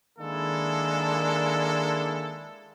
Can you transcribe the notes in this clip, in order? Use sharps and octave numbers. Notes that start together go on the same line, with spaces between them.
D#3 G#3 A#3 D4 E4 A4